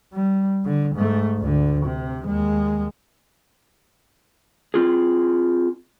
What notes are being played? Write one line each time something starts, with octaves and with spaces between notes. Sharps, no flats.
G3
D3
G#2 A3
D2 D3
C3
D#2 G#3
C4 F4 G#4